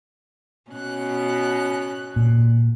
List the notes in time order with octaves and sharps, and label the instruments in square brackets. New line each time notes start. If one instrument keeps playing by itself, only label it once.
[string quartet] B2 C#4 F#6
[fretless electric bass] A#2